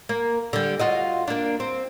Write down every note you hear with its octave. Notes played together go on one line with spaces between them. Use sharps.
A#3
D3 G3
F4 F#4 D#5
A#3 D4
C4